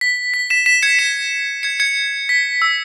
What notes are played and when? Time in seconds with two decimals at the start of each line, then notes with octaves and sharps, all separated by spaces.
0.01 B6
0.34 B6
0.50 B6 E7
0.66 B6 E7
0.82 G#6 C#7
0.99 B6 E7
1.63 G#6 C#7
1.80 G#6 C#7
2.29 B6
2.62 E6